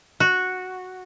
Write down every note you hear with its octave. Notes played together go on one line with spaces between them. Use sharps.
F#4